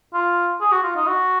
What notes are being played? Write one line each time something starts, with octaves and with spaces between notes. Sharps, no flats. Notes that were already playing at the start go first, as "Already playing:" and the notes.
F4
G#4
F#4
F4
D#4
F#4